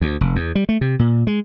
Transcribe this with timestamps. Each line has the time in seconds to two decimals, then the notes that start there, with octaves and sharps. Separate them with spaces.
0.01 D2
0.21 F1
0.36 E2
0.55 G3
0.69 A3
0.81 C3
0.99 A#2
1.27 G#3